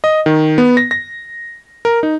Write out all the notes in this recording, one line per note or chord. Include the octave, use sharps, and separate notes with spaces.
D#5
D#3
B3
A#6
A#6
A#4
D#4